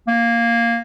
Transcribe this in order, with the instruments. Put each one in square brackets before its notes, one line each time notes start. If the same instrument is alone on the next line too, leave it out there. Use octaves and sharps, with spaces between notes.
[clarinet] A#3